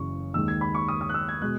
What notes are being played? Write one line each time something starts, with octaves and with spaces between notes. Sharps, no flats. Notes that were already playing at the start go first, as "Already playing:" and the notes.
Already playing: F#1 F#2 C#3 E3 C#6
D#2 D#3 G#3 E6
G#6
B5
C#6
D#6
D#6
F#6
E6
G#6
B2 G#3 F#6